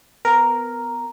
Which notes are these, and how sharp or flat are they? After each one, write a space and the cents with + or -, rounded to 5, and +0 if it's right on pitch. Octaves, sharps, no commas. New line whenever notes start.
B3 +20 A#4 +0